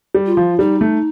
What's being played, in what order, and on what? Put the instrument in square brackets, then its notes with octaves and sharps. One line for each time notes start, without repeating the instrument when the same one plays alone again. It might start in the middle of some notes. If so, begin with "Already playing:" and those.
[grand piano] G3
[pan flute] F4
[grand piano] F3
[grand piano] G3 [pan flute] D#4
[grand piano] A3